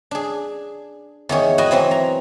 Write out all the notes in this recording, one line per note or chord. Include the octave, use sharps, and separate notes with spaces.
D4 G#4
E2 D#3 C#5
E4 F#4 D#5 G5
E3 F#3 C4 E4
A#5